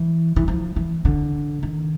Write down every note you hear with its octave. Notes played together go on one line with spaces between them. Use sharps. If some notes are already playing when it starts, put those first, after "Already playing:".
Already playing: E3
E3
F3
E3
D3
D#3